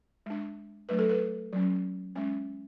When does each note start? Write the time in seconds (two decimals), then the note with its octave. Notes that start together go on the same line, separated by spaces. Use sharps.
0.26 G#3 D4
0.89 F#3 A3 D4 B4
0.99 A4
1.09 B4
1.53 F#3 C#4
2.16 G#3 C#4